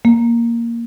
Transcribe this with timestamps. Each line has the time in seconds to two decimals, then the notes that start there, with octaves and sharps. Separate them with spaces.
0.05 A#3